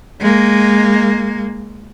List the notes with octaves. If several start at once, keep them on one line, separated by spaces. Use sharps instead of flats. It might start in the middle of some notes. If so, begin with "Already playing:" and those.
G#3 A#3